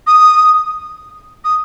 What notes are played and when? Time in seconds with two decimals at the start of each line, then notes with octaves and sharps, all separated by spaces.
0.07 D#6
1.44 D#6